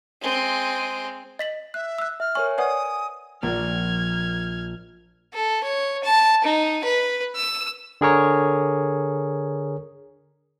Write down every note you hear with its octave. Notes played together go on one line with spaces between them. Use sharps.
G#3 C4
D#5 B6 F#7
E5 F#6
E6 F#6
E5 F6
A#4 C#5 G#5 C#6
B4 D5 F#5 G#5 D#6
A#1 A#2 F6 G#6
A4
C#5
A5
D#4
B4
E6
D3 G#4 A#4 C#5